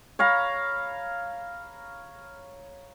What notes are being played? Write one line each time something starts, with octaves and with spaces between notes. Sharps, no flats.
C#5 F5 A#5 B5